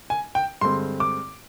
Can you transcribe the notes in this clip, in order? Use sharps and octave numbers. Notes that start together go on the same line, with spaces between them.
G#5
G5
G2 D3 G#3 C4 C6
D6